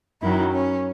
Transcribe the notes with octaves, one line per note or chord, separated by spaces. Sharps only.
F#2 D#3 F#3 E4
C#4